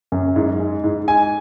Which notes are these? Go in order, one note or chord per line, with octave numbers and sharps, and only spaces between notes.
F#2
G#2
G#3
G#2
G#3 G#5